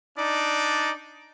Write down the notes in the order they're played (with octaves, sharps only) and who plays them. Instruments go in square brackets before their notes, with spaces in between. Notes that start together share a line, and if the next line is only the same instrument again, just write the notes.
[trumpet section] D4 D#4 D5